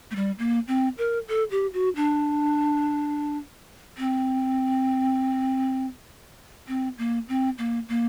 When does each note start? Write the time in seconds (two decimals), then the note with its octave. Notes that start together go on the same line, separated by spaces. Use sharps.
0.11 A3
0.16 G3
0.39 A#3
0.68 C4
0.98 A#4
1.28 A4
1.51 G4
1.73 F#4
1.96 D4
3.98 C4
6.68 C4
6.98 A#3
7.29 C4
7.58 A#3
7.89 A#3